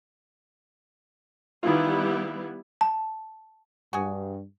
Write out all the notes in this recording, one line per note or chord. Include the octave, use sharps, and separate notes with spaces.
D#3 E3 G3 B3 E4 F4
A5
G2 F#4 G#4